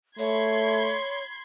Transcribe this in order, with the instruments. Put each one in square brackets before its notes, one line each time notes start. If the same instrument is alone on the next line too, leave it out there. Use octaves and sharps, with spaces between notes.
[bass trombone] A3 [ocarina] C#5 [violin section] B5 C6 G#6